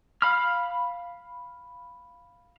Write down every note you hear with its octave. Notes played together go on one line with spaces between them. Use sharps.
F5 B5 F6